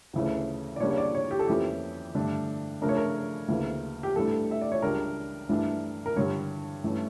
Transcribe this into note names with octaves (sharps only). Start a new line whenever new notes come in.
D2 C#3 E3 A3 C#4
D5
C#3 G3 A#3 D4 C#5
C#5
D5
C#5
G4
A4
F2 E3 A#3 C#4 G4
G2 D3 A3 D4
C#3 F3 A3 D4 A#4
C#5
A#4
D2 C#3 E3 A#3
G4
A2 E3 G3 D4 A4
E5
D5
C#5
C#2 C#3 G3 D4 A#4
G2 E3 A3 D4
A#4
G2 D3 G3 C#5
G2 E3 A3 C#4